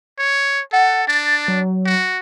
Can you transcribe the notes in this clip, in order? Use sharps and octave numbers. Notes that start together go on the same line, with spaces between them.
C#5
A4 F#5
D4 A6
F#3
F#4